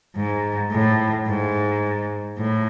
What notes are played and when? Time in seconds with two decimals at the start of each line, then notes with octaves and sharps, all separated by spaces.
0.16 G#2
0.72 A2
1.27 G#2
2.38 A2